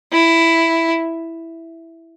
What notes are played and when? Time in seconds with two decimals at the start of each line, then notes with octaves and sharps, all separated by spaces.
0.12 E4